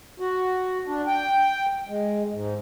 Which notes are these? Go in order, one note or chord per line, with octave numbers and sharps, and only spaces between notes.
F#4
D4
G5
G#3
G#2